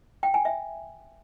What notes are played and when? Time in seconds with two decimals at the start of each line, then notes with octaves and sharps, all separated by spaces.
0.23 G5
0.34 G#5
0.45 E5